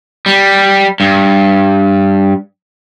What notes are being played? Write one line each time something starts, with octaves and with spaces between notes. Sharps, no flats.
G3
G2